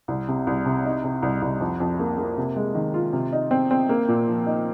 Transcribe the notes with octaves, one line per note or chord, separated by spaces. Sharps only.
C2
C3
C2
C3
D#4
C3
C2
C2
F2
F2
A#3
A#3
C3
G#3
D#3
F4
C3
D#4
C4
C4
A#3
A#2
F3
D#4